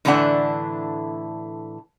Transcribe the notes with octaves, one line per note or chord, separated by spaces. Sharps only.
A2 D3 E3 A3 D4 F#5